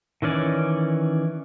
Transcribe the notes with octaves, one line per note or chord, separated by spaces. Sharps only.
D#3 E3 C#4 D5